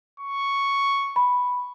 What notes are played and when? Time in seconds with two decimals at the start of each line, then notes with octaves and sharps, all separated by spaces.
0.20 C#6
1.16 B5